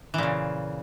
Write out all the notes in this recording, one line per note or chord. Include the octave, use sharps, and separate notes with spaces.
A#2 C#3 E3